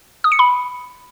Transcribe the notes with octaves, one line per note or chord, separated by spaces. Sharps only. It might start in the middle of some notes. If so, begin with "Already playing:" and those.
D#6
C#7
B5